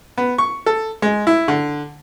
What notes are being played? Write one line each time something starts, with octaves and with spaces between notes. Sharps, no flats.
B3
C#6
A4
G#3
E4
D3